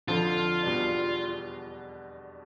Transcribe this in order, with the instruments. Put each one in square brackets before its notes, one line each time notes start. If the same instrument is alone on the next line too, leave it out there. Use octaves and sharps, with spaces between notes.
[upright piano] F2 D3 F3 [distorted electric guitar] F4
[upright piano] E2 B2 G3 B3 D4